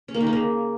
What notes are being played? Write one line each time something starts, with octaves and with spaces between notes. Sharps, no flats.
C#4
A#3
D#3
A#3
C#3